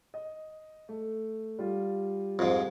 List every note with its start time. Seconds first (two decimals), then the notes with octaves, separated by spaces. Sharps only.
0.14 D#5
0.89 A3
1.59 G3 F4
2.39 F2 G#2